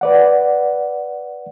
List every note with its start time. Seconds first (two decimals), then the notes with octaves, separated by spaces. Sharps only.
0.01 B4 D5 F#5